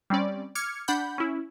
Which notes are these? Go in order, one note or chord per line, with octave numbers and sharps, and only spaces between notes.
G3 C4 C#4 D5
D6 F6 G#6 C#7
D4 F#5 B5 G6
C#4 E4